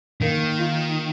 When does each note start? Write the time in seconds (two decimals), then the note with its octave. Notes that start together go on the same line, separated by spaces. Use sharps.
0.22 D#3 A#3
0.58 F4